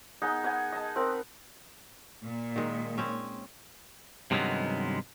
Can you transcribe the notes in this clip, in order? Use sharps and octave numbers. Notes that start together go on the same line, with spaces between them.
B3 D#4 G#4
B4 D#5 F#5 G#5
D#5 A5
C4 A#4 B4
A#2
D#3 G#3
C4 C#4
G2 C3 D#3 F#3 G#3 B3